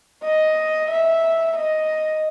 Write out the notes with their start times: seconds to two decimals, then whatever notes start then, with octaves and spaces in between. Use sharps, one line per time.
0.23 D#5
0.89 E5
1.56 D#5